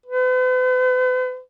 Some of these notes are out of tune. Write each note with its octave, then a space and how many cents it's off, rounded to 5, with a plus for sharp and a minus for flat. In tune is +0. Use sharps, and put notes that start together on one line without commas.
B4 +45